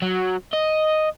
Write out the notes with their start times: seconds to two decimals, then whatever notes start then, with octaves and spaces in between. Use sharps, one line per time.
0.02 F#3
0.53 D#5